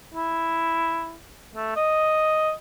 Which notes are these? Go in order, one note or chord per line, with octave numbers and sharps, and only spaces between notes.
E4
A3
D#5